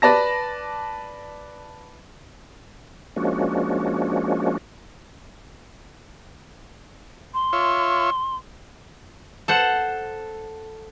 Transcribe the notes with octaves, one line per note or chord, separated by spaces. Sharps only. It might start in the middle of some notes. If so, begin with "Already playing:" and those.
B4 D5 A5 A#6
F3 G#3 A#3 C#4 D4 F#4
C6
F4 C#5 E5
A4 C5 F#5